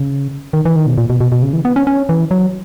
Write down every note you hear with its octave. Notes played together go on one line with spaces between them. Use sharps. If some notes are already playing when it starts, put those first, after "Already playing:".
Already playing: C#3
D#3
E3
D#3
B2
A#2
B2
B2
B2
C#3
E3
B3
C#4
C#4
E3
F#3